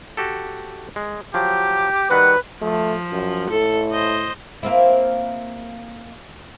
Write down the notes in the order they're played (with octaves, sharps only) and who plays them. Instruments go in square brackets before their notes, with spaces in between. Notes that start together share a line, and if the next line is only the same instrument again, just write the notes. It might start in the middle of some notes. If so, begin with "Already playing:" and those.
[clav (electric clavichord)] F#4 G4 A4
G#3
[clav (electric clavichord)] F3 F#3 [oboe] G4
[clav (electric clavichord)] D#3 G3 F#4 [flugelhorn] B4 [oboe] F#5
[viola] F3 [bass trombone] A3
[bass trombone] F#2
[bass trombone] A2 [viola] A4
[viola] C5 D#5
[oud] A#3 C4 E4